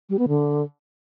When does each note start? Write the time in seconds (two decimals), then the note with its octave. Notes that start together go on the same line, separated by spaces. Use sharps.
0.09 G3
0.19 B3
0.28 D3